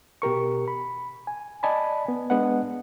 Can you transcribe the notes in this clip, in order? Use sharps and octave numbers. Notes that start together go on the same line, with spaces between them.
B2 G4 A#4 C#6
B5
G#5
D5 D#5 G#5 A5 B5
B3
G#3 B3 D4 D#5 F#5